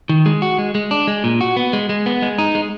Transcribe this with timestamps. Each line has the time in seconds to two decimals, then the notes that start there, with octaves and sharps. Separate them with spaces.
0.09 D#3
0.26 G#3
0.42 F#4
0.58 G#3
0.75 G#3
0.91 D4
1.07 G#3
1.24 A#2
1.41 F#4
1.57 B3
1.73 G#3
1.89 G#3
2.06 B3
2.22 G#3
2.38 D#4
2.55 G#3